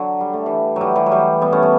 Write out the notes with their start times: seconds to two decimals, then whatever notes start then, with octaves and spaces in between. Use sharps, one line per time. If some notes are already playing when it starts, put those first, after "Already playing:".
Already playing: D3 F#3
0.21 G3
0.33 A3
0.46 E3 G3
0.76 E3 F#3 G3
0.96 E3 G3
1.06 F#3
1.11 E3 G3
1.41 G3 B3
1.52 A3 C#4
1.63 G3 B3